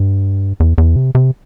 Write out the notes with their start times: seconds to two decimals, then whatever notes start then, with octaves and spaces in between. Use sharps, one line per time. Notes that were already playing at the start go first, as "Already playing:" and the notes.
Already playing: G2
0.60 E2
0.78 E2
0.96 C3
1.15 C3